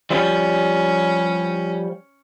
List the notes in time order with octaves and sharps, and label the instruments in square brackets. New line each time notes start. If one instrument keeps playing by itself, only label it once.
[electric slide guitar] F3 G3 [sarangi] C#4